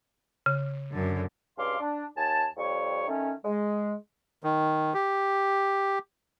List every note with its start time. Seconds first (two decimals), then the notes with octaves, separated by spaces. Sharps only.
0.46 C#3
0.92 F#2 D3
1.58 C#2 G2 F5 C6 D6
1.80 D4
2.16 D#2 G#5 A5
2.57 F2 G3 C#5 C#6
3.08 D#3 A3 C#4
3.44 G#3
4.44 D#3
4.94 G4